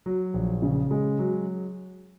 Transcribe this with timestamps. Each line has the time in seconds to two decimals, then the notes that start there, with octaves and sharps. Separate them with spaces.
0.06 F#3
0.34 A#1
0.62 C#3
0.91 G#3
1.19 F#3